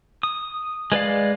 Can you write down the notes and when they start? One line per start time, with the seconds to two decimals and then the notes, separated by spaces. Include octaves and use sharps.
0.23 D#6
0.92 G#3 B4 D5 F5